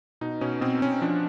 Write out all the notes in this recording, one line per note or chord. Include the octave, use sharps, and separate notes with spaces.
B2 D#4
B2 C#4
B2 C4
B2 C#4
F3 D4